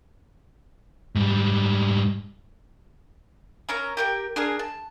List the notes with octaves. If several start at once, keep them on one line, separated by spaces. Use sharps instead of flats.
G#2 G3
C#4 A#4 A#5 E6
G4 A#4 G5
D4 G#4 A#4
A5